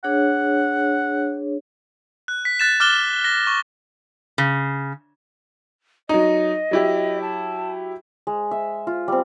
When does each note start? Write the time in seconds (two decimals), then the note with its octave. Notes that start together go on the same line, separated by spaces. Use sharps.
0.04 D4 G#4 C#5 F#5
2.28 F#6
2.45 B6
2.60 F#6 A6 E7
2.80 D6 F6 F#6 A6 E7 G7
3.25 A#6 G7
3.47 C#6
4.38 C#3
6.09 F#3 D#4 D#5
6.71 F#3 E4 G4
7.22 A5
8.27 G#3
8.51 E5
8.87 F4
9.08 G3 C4